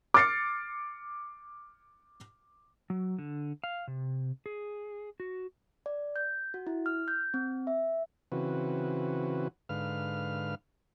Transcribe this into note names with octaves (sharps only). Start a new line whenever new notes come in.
D6 F6 A6 C7 C#7
F#3
D3
F5
C3
G#4
F#4
D5
G6
F#4
E4
F6
G6
C4
E5
C#3 E3 C4 F#4 B4
G#2 D3 B4 F5 F6